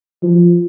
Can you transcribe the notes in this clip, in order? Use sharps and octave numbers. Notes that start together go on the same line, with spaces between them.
F3